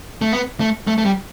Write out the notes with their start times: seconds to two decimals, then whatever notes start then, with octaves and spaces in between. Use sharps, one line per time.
0.21 A3
0.32 B3
0.60 A3
0.87 A3
0.98 A3
1.05 G3